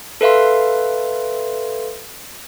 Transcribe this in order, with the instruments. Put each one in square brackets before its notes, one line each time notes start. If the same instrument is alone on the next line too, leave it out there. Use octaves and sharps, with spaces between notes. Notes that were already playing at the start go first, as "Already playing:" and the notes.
[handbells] A4 B4 E5 F5 C6